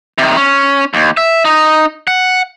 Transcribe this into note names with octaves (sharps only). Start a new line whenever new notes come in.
C3 D#3
C#4
D#2
E5
D#4
F#5